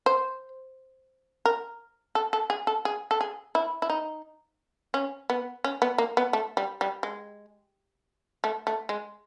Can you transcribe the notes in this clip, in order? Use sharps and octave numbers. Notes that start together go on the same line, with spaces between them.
C5
A#4
A4
A4
G#4
A4
G#4
A4
G#4
E4
E4
D#4
C#4
B3
C#4
B3
A#3
B3
A3
G3
G3
G#3
A3
A3
G#3